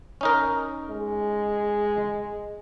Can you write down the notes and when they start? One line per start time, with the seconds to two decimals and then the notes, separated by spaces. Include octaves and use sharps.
0.21 C#4 D#4 A#4
0.90 G#3